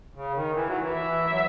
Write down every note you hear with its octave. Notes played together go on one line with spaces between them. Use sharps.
C#3
D#3
E3
F#3
E3
E5
F#3